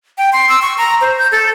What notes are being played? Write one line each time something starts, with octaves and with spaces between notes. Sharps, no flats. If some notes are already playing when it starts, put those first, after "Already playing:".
G5
C6
E6
C#6
A#5
C5
G6
A4